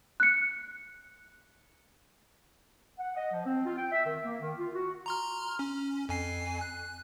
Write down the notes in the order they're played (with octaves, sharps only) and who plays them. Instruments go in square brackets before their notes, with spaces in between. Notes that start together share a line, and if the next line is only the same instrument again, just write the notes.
[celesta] F#6 C#7
[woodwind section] F#5
D#5
F3
C4
F4
G5
E5
D#3
A#3
D#3
F4
F#4
[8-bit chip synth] A#5 C6 F6
C#4
F2 G#5 C7
F#6